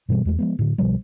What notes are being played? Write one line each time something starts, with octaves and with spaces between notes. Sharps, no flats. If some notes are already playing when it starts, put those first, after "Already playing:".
G2 B2 E3 G3
E2 G#3 A3
F3 G#3 B3
A2 D3
B1 B2 F3 G3